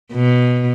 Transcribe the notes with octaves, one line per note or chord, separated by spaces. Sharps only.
B2